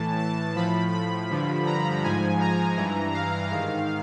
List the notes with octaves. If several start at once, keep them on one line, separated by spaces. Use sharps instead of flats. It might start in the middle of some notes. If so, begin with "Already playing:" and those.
Already playing: A2 E3 A5
A5
A2 F3 B5
B5
G2 D3 F3
A#5
G#2 F3 G#5
A#5
G2 E3
F5
G#2 D#3 F5